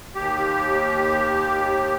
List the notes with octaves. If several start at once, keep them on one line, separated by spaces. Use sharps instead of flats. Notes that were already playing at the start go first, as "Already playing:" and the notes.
D#2 G4